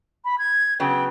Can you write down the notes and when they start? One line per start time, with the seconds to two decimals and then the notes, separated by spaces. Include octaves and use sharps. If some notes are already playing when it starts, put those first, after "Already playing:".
0.25 B5
0.38 G#6
0.80 C#3 F#3 B3 G5